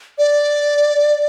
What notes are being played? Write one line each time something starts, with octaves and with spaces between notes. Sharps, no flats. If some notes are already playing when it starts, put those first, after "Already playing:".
D5